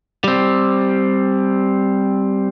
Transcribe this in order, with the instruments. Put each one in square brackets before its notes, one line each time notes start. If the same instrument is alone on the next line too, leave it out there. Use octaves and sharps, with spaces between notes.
[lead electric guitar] G3 C4